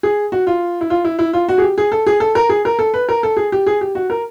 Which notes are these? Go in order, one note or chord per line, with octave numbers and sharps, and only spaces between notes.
G#4
F#4
F4
E4
F4
E4
E4
F4
F#4
G#4
G4
G#4
A4
G#4
A4
A#4
G#4
A#4
A4
B4
A#4
A4
G#4
G4
G#4
G4
F#4
A#4